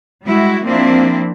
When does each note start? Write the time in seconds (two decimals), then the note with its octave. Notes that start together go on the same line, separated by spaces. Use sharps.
0.24 G3 G#3 E4 F#4
0.63 F3 A#3 C4 D4 E4